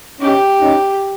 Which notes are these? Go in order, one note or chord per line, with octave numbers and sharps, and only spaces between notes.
C#4 D#4 G4
C#4 D#4